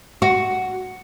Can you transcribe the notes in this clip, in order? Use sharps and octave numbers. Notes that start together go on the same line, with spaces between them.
F#4